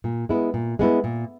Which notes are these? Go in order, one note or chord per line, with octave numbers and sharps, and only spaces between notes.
A#2
G#3 B3 E4
A#2
G#3 B3 E4
A#2